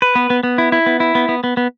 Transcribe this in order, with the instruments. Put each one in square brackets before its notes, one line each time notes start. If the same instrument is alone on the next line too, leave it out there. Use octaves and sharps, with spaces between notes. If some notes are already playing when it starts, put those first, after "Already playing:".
[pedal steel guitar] B4
B3
B3
B3
E4
E4
B3
E4
B3
B3
B3
B3